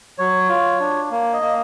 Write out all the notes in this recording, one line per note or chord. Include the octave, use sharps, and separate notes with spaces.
F#3 C#5
F4
D4
A#3
D#5
A#3